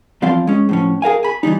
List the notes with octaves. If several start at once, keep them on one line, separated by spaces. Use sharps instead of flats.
E2 F3 C4 D5 F5 C6
G#3 C#4
A2 F3 C#4
G#4 A#4 F5 G#5
G#5 B5
E3 F3 G3 D#4